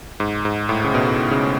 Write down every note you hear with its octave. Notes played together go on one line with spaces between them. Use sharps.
G#2
G#2
A2
C#3
B2
C#3